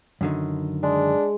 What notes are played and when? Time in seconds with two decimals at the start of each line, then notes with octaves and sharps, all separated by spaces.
0.21 F#2 D3 D#3
0.83 G#3 D4